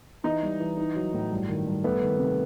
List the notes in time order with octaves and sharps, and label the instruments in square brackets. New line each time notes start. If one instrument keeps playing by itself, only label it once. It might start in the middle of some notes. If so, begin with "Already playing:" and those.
[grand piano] E3 [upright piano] D#4
[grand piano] G3
E3
D#4
F#3
A2
G2
D#3
G2
[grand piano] A3 [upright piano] B3
[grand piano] D#3
C3